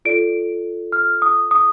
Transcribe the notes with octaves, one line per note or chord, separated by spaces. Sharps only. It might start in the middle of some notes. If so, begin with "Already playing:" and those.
F4 A4 D5 D7
F6
D#6
D#6